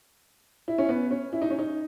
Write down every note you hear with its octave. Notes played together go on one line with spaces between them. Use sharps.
E4
C#4
B3
C#4
E4
D#4
C#4
D#4